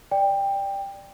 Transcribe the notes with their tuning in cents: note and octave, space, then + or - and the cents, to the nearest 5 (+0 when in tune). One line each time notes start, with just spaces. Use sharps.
D5 +0 G5 +15